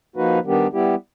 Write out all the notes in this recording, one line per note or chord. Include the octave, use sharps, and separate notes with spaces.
F3 A#3 D#4 F#4 B4
D#3 G3 B3 D4 G4
G3 B3 E4 G4